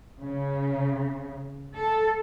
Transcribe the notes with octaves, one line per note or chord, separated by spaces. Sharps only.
C#3
A4